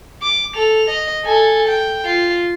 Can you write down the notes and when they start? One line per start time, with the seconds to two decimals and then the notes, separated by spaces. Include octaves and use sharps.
0.22 D6
0.55 A4 F7
0.90 D#5
1.25 A4 G#5
1.68 G5
2.06 F4